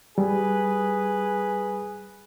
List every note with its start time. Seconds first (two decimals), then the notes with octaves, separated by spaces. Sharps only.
0.18 G3 G#4 B4